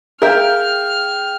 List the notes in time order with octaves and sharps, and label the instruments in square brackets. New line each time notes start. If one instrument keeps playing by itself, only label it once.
[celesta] G#4 [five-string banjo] A#4 E5 [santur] F5 G5 G#5 [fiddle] F6